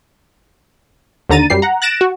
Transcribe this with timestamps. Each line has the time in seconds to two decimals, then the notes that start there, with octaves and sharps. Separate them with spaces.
1.30 D#2 D3 A#5 A6 D#7
1.50 F#2 G3 G4 C7
1.62 F#5 A#5
1.82 F#6 A6 A#6 D7 E7
2.01 F#4